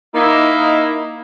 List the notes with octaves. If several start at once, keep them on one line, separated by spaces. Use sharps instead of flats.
A#3 D#4 E4